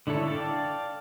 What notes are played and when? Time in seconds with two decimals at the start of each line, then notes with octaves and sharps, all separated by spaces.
0.07 D3 D4 E4 A4 C#5
0.27 D5 F5 G5 A5